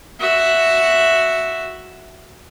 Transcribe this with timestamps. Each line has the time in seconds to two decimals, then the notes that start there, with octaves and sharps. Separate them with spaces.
0.20 F#4 E5